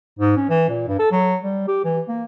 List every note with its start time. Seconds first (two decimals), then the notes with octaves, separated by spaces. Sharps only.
0.19 G#2
0.37 C#4
0.49 E3
0.69 A#2
0.88 G2
0.99 A4
1.11 F#3
1.43 G3
1.67 G4
1.84 E3
2.08 A#3